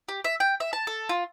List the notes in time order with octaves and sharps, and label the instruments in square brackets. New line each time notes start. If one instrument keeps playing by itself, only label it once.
[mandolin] G4
E5
G5
E5
A5
A4
F4